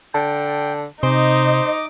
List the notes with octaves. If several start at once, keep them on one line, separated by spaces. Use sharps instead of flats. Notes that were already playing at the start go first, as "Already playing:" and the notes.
D3 G5 A5
C3 D#4 C5 D#5 D6